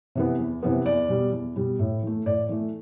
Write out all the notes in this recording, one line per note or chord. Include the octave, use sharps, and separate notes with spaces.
C3 E3 B3
E2
C3 E3 B3
E2 D5
B2 G3
E2
B2 G3
A2
E3 A3
A2 D5
E3 A3